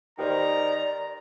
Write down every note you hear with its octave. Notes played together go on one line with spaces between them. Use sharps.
D#3 G4 B4 C5 D5 A#5